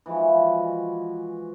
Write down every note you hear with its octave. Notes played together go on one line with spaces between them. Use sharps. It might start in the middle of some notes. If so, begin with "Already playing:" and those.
E3 F3 G#3 F#4